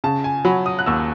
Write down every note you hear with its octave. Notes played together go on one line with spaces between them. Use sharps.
C#3 A5
G#5
F#3 B5
D#6
F#6
D#2 E6